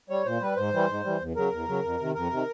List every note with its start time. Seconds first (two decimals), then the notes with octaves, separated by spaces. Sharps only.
0.10 G3 C#5
0.25 A#2 C5
0.41 G3 B4
0.57 G#2 C5
0.73 E3 G3
0.89 G#2
1.04 E3 G3
1.20 E2
1.36 C#3 F#3 A#4
1.52 E2
1.68 C#3 F#3
1.83 F2
1.99 C3 D#3
2.15 F2 A#4
2.31 C3 D#3